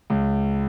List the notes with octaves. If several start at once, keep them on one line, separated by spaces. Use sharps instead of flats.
C#2